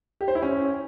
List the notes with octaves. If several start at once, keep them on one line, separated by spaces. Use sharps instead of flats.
G4
C5
E4
C#4